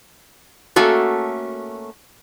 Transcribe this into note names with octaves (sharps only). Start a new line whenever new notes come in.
A3 A#3 C#4 F#4 A4